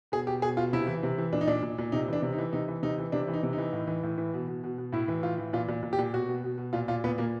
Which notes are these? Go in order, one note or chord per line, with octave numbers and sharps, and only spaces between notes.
B2 G#4
B2 G4
B2 G#4
B2 F4
C3 E4
E3
C3
E3
A#2 D4
D#4
A#2 D4
A#2
A#2
C3 D#4
E3
D4
C3
D#4
E3
C3 D#4
E3
C3 D#4
E3
C3 D4
E3
D#4
C3
D#4
E3
A2
E3
A2
E3
B2
B2
B2
B2
A2 E4
E3
A2 F4
E3
A#2 F4
A#2
A#2
G4
A#2
B2 F#4
B2
B2
B2
A#2 F4
A#2 F4
A#2 B3
A#2 A#3